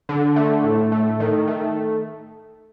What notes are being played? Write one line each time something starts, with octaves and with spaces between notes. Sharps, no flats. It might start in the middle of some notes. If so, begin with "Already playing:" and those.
D3
A3
A2
A3
D#3
A3